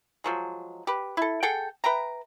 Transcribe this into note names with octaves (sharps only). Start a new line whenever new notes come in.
F3 F#3 G#3
G4 B4
E4 A4
G#4 A4 F#5 G5
B4 E5 G5 A#5